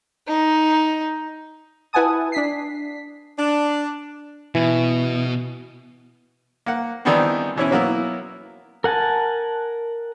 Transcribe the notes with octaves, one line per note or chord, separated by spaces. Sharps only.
D#4
E4 B4 F#5 G#5 A5 D#6
D4 B6 C7
D4
B2 E3
A#3 F#5
D#3 E3 G3 B3 C4 D4
B2 E3 C#4 E4
F#3 A#3 B3 E4
A#4 F#5 G#5 A5